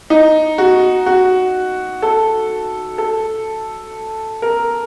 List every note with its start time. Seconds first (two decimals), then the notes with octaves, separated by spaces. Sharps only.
0.10 D#4
0.58 F#4
1.06 F#4
2.02 A4
2.98 A4
4.42 A#4